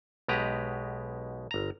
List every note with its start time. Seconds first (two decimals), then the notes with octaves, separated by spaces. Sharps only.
0.28 B1 B2 G#3 G4 B4 A#5
1.51 G1 A#5